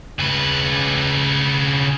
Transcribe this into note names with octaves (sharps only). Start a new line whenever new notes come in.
C#3 B4